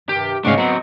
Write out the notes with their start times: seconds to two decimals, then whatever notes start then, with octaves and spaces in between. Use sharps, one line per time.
0.09 G2 C3 D#3 G4
0.45 D2 G#2 C#3 D4 D#5 F5 C#6
0.58 F#3 B3 C4